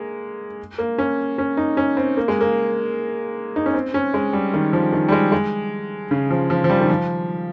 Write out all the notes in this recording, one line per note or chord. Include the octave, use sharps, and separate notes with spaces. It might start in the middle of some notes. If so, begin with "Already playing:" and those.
Already playing: G#3 A#3
A#3
C#4
C#4
D#4
C#4
C4
A#3
G#3
A#3
D#4
C#4
C4
C#4
G#3
G3
D#3
F3
D#3
G3
G#3
G#3
C#3
F3
F3
F3
G3
D#3
F3